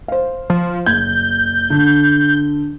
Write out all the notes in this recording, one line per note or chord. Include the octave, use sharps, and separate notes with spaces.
C5 F5
F3
F#1 G6 G#6
D3